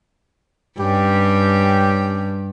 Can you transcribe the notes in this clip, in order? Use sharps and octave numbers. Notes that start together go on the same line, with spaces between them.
G2 C#4 G4